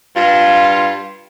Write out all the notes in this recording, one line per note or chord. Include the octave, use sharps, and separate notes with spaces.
G2 F4